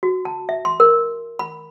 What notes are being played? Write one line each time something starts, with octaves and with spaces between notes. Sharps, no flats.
F#4
A5
E5
C6
A#4
B5